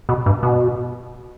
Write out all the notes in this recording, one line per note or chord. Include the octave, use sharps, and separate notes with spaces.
B2
G2
B2